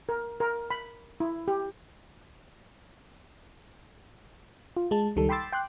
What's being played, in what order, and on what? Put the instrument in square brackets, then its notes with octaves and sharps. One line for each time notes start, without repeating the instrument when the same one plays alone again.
[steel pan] A#4
A#4
B5
E4
G4
[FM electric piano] F4
G#3 A5
C#2 D#3 G3 A4
G5 B5 C6 D6 E6 A6
G5 C6 D6 F#6